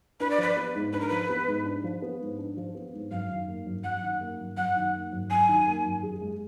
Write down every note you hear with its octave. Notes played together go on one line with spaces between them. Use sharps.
D4 B4
D5
F3 B4
B3
G#2
D4 B4
A#4
F3 B4
B3
G#2
D4
F3
B3
G#2
D4
F3
B3
G#2
F#2 F5
D#3
A#3
F#2
F#2 F#5
D#3
A#3
F#2
F#2 F#5
D#3
A#3
F#2
F#2 G#5
D#3
A#3
F#2
G#4
G#3